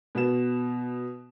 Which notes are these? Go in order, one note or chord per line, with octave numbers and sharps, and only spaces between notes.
B2 B3 F#4 E7